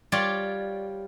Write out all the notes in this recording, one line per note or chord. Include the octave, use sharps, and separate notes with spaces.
G3 F4 C#5 D5